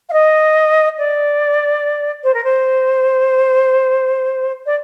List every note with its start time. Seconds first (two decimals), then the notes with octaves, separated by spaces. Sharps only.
0.09 F5
0.12 D#5
0.98 D5
2.23 C5
2.34 A#4
2.44 C5
4.66 D5